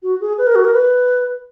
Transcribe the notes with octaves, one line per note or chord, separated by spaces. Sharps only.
F#4
G#4
B4
A#4
F#4
A#4
B4